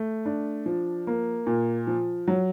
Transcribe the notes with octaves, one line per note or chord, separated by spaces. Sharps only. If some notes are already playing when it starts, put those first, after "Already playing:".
Already playing: A3
D4
F3
A#3
A#2
F3
F#3